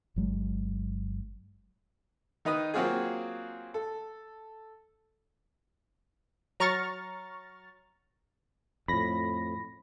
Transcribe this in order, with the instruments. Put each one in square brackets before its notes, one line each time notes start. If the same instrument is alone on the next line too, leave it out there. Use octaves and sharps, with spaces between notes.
[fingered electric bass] G1 F#3 G#3
[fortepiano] D#3 D#4 B4 D#6
F#3 A#3 C4 F4 F#4 G#4
A4
[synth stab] F#3 A#5 C#6 F6 A6
[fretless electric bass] F2 A2 [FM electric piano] B5 A#6